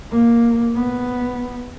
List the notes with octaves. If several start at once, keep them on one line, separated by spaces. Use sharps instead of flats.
A#3
B3